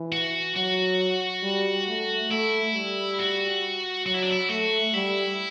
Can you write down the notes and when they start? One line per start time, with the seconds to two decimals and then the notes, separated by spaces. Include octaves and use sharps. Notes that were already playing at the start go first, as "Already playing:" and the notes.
Already playing: E3
0.12 F#4
0.55 F#3 F#4
1.43 G3
1.87 A3
2.30 A3 E4
2.74 G3
3.19 F#4
4.06 F#3 F#4
4.14 E4
4.22 D4
4.30 E4
4.49 A3 F#4
4.94 G3 E4